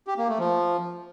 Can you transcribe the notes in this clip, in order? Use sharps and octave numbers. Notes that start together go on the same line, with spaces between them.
G4
A#3
A3
F3